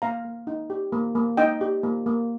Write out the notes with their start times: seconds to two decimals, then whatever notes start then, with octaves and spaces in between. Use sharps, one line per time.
0.02 A#3 F5 A#5
0.25 A#3
0.47 D#4
0.70 G4
0.93 A#3
1.15 A#3
1.37 D#4 D#5 G5
1.61 G4
1.83 A#3
2.06 A#3